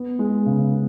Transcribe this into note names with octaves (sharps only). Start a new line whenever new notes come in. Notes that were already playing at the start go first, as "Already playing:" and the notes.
Already playing: B3
G#3
C#3
B3